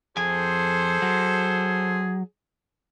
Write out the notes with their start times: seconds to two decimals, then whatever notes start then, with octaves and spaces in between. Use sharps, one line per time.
0.17 F2 G#4 A4 C5 G#5
1.02 F#3